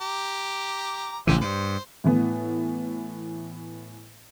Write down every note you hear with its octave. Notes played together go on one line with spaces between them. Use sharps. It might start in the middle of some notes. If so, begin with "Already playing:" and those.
G4 A#5 D6
A1 C#3 E3 G4 C5 E5
G2 C5
A2 E3 B3